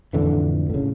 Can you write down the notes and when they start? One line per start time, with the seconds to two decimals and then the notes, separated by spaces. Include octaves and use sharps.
0.13 F2 A2 D3 E3
0.70 A2 C#3